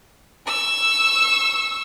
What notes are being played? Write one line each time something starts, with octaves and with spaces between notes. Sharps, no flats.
C#6 E6